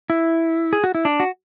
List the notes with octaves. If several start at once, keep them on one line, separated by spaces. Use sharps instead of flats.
E4
G#4
F#4
E4
D4
F#4